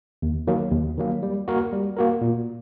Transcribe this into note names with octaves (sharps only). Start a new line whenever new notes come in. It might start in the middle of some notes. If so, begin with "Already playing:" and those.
D#2
D#3 F#3 A#3
D#2
D#3 F#3 A#3
G3
A#3 F#4 A#4
G3
A#3 F#4 A#4
A#2